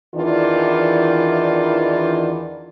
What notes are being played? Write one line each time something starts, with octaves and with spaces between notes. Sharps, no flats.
E2 D#3 E3 D4 F4 D5